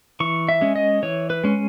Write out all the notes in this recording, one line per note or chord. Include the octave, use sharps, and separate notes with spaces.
E3 C#6
E5
G#3 C#4
D#5
E3 C#5
B4
G#3 C#4